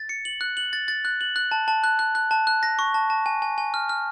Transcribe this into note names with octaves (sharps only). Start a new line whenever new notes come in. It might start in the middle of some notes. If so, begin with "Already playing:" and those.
Already playing: A6
C#7
F#7
F#6
F#7
A6
A6
F#6
F#7
F#6
A5
A5
F#6
F#6
F#6
A5
F#6
A#6
C#6
A5
A5
G#5
G#5
G#5
F6
F6